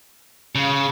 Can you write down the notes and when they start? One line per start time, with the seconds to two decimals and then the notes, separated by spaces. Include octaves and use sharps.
0.55 C#3